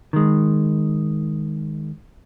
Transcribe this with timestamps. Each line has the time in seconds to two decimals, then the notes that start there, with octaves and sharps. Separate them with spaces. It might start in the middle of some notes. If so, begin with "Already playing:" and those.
0.13 D#3 G#3